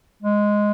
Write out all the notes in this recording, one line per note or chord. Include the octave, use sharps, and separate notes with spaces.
G#3